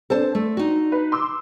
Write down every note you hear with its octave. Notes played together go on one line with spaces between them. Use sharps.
C4 D4 A4 C5 A5
A3
D#4 F#4
B4
C6 D6 E6